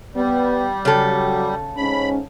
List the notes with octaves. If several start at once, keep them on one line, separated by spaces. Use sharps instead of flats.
G3 B3
C#3 F#3 A4
G#2 C#4 B5